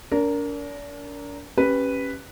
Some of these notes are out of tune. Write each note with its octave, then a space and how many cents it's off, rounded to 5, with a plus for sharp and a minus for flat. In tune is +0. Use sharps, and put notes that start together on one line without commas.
D4 -40 A#4 -5
C#4 -15 G4 +0 B4 +0